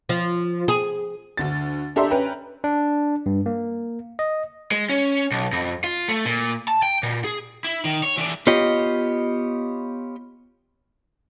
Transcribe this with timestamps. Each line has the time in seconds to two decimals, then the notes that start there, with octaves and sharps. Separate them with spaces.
0.09 F3
0.68 G#4
1.37 D2 D3 A6
1.96 D4 G4 A4 E5 A#5 C6
2.10 C#4 B4 G5 A#5 B5
2.64 D4
3.26 G2
3.46 A#3
4.19 D#5
4.71 G#3
4.89 C#4
5.31 B1
5.52 F2
5.84 F4
6.08 A3
6.26 A#2
6.68 A5
6.83 G5
7.03 A#2
7.24 G#4
7.64 E4
7.85 D#3
8.03 C#5
8.17 E3 D4
8.47 B3 F4 G4 C#5 D#5